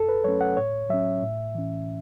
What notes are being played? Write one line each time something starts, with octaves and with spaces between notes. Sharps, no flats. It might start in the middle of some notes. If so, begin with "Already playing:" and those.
Already playing: F#2 A4
B4
F#3 A3 C#4 C#5
F#5
A2 C#5
F#3 C#4 E5
A2
E3 C#4